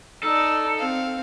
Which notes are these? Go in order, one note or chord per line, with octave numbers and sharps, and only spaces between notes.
D#4 A4 D5
C4 F5